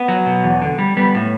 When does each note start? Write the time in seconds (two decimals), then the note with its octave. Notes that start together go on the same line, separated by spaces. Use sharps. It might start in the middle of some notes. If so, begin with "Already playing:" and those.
Already playing: B3
0.08 F#3
0.26 B2
0.44 E2
0.62 D3
0.78 G3
0.97 G3 B3
1.15 A2